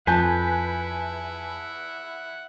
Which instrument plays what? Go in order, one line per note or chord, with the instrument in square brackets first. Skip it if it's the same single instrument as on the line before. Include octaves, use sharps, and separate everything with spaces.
[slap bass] F2 [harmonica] E4 F#5 [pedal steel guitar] B4 [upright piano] G#5 A5 G6